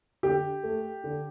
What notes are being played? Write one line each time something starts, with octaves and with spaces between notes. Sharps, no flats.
D3 G4
A3
D3